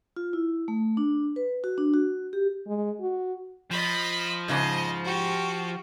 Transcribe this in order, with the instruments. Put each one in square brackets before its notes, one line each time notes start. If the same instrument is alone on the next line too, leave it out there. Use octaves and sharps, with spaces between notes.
[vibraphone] F4
E4
A3
D4
B4
F#4
D4
F#4
G4
[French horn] G#3
F#4
[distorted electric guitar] F3 [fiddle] D#5 B5
[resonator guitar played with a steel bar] G#2 C#3 [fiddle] D#5
[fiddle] F#4 G4